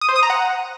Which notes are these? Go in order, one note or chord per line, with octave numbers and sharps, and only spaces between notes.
D#6
C5
D#6
A#5
F#5